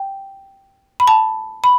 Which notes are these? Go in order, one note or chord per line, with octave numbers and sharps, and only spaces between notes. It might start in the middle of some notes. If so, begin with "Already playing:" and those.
Already playing: G5
B5
A5
B5